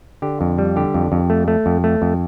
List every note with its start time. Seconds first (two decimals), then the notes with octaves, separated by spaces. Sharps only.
0.22 D3 G4
0.41 F2
0.58 G3
0.76 D3 G4
0.94 F2
1.12 F2
1.30 A3
1.48 A3
1.66 F2
1.84 A3
2.02 F2